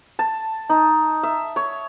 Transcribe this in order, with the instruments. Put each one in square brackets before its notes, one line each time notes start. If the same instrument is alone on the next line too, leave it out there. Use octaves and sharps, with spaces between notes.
[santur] A5
D#4
E5
C#5